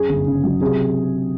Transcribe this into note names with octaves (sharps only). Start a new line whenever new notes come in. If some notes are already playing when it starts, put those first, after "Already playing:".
Already playing: F#2 G#4
G1
C#3
F#3
C3 G#4